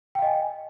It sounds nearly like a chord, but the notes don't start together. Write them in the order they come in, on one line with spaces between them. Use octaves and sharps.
G5 F5 D#5 G#5